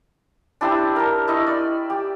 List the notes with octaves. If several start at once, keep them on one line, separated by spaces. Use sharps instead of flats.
D4 E4 G4 C5
D4 A#4
E4 D#5 C#6
D5
G4